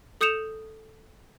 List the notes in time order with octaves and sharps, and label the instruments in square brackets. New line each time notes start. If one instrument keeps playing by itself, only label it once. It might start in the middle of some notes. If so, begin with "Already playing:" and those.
[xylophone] A4 D#6 G6 C#7 E7 F7